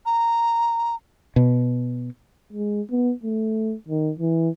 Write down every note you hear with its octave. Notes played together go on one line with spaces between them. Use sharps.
A#5
B2
G#3
B3
A3
D#3
E3